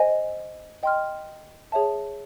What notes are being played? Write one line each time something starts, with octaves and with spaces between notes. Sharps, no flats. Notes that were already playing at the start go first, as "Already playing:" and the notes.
Already playing: C5 D#5 G#5
D#5 G5 C6 F6
G#4 C#5 E5 A5